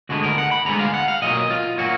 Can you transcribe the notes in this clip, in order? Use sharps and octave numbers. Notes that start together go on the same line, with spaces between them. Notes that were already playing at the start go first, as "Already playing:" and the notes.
D2 D3 G#3 B3 F#4
A#4
F#5
B5
D2 D3 G#3 B3 A#5
F5
F#5
F5
B1 A#2 F#3 A#3 D#5
F4
A#2 F#3 A#3 F#4